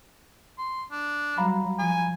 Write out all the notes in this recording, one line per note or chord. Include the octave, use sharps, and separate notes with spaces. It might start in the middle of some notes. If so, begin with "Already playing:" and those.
C6
D4
F#3 G3 F5 A#5 B5
F3 G#5